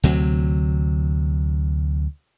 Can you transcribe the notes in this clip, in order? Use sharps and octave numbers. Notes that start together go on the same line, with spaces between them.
D2 C3 F#3